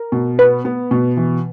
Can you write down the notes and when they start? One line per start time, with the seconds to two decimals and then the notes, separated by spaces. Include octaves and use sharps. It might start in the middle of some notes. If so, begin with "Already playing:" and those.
Already playing: A#4
0.12 B2
0.39 B3 B4
0.65 B3
0.91 B2
1.17 E3